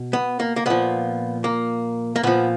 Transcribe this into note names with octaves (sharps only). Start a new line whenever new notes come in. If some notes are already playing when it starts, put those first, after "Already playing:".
Already playing: B2
B3
A#3
A#3
A#2 F3 B3
A#3
A#3
A#2 F3 B3